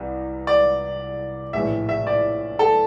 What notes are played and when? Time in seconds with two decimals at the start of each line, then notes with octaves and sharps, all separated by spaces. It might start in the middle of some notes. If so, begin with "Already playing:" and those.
Already playing: C2 C3 E3
0.47 D5
1.53 A#1 A2 E3 E5
1.89 E5
2.07 D5
2.59 A4